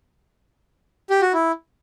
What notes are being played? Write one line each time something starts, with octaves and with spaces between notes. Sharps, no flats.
G4
F#4
E4